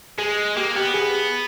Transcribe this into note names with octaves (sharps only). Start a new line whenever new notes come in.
G#3 G#4
A#3 G4
B3 G4
G#4